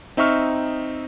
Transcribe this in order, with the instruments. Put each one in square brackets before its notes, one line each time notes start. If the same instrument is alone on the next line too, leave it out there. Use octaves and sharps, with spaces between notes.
[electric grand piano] C4 D#4 E5 C#6 F6